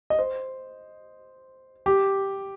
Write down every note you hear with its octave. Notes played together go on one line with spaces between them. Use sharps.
D#5
C5
G4